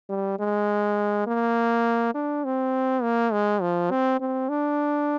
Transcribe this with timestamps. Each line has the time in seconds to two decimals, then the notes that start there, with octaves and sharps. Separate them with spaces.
0.09 G3
0.39 G#3
1.27 A#3
2.14 D4
2.45 C4
3.02 A#3
3.32 G#3
3.62 F3
3.91 C4
4.20 C4
4.49 D4